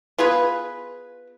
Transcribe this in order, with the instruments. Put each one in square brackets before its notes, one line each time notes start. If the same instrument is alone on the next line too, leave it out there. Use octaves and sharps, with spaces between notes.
[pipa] B3 F4 G#4 B4